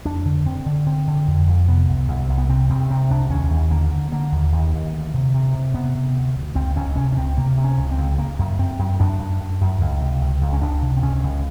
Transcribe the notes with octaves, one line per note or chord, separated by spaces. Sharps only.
F2 D4
D3
D3 C4
D3
D3 C4
D3
F2
F2
C3 B3
C2
C2
C2
B3
C3 C4
C2 C4
C3 C4
C2 D4
D#2 C#4
D#2
D3 A#3
D3
D3 A#3
D#2
D#2
D#2
D2
C3
C3
C3
C3 B3
C3
D2
D2
C#2 C4
C#2 C#4
C3 C#4
C#4
C#2 C4
C3 A#3
C3
C#4
C#2
C4
C#2
C#3 A#3
F#2
F#2 C4
F#2
F#2 D4
F#2
F#2
F#2
C#2
C3
C#2
C#2
C#4
C#2 D4
C3
C4
C#2 C#4
C#2